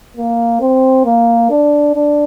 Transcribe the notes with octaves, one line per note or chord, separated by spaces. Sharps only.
A#3
C4
A#3
D4
D4